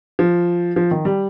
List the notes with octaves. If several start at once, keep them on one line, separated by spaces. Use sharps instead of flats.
F3
F3
D#3
G3